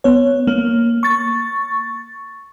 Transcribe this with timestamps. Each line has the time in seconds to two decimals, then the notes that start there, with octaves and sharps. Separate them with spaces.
0.04 B3 C#5
0.47 A#3
1.03 C#6 A6